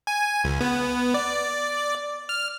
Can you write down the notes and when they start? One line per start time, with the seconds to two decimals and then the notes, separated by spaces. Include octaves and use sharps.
0.07 G#5
0.44 C#2
0.61 B3
1.14 D5
2.29 F6